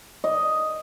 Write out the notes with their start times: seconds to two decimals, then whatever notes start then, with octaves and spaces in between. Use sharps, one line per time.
0.24 D#5